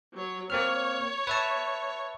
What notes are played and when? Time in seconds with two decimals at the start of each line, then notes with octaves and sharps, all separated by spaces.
0.13 F#3 C#5
0.50 A#3 C4 C#5 F6
1.27 B4 E5 A5